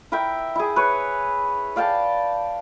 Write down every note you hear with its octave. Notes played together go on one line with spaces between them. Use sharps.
E4 A#4 E5 G5
E4 G#4
B4 C#5
D5 F5 G5 A5